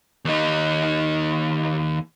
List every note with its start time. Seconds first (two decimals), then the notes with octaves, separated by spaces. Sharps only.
0.25 D#2 D#4